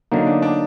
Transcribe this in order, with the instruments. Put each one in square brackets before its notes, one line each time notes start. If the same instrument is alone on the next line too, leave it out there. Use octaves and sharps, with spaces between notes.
[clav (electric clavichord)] D3 F#3 A#3 [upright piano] D#4
[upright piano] D4
D4